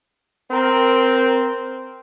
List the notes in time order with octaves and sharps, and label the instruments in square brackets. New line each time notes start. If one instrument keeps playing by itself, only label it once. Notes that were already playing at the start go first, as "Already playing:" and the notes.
[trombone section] C4 A#4